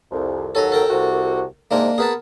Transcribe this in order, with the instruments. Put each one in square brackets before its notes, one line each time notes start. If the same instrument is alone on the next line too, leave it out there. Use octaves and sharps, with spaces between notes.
[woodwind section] C2 F2
[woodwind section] D#2 F#3 [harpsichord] A4 G#5 A#5
[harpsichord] A4 A#4 G5
[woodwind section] C2 C3 F#4
[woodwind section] G#2 C3 [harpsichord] A#3 D4 A#4
[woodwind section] B3 A#4 [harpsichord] G#4 B4 A5